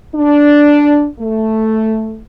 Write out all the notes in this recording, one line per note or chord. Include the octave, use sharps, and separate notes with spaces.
D4
A3